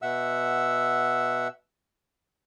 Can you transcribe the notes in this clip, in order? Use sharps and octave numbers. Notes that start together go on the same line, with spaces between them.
B2 E5 F#5 E6